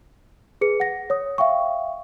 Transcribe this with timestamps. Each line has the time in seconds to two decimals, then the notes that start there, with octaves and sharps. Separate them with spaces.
0.61 G#4 B4 C#7
0.80 F#5 A#6
1.10 C#5 D#6
1.38 E5 F5 G5 C#6